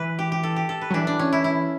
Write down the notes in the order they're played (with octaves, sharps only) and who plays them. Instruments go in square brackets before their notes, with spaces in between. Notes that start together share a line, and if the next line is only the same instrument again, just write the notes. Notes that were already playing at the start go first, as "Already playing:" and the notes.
Already playing: [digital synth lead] E3 [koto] B4
[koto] G4
G4
A4
G4
A4
B4
[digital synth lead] F#3
[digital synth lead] E3 [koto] D4
[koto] D4
C#4
E4
E4